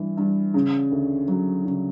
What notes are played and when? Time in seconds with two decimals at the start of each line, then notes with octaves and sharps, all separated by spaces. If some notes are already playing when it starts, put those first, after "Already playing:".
Already playing: G2 E3
0.17 G2
0.54 C#3
0.92 D2
1.28 F#3
1.65 C#3